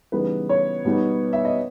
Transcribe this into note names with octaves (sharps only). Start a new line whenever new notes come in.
C#3 E3 G3 B3 D#4 B4
C#5
B2 G3 B3 D#4
E5
D#5